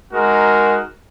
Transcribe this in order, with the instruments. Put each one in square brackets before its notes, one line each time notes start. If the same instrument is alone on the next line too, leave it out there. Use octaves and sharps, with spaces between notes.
[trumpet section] G#3 D#4 F#4 A#4